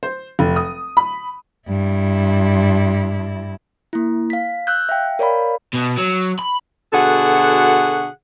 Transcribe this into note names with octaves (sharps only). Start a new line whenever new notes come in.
C5
F1
D#6
B5
G2 E4
A#3 E4
F5 B6
E6 F#6 G6
E5 F5 G5
A#4 C#5 D5 F5 B5
B2
F#3
B5
B2 D3 F#4 G#4 A4 F#5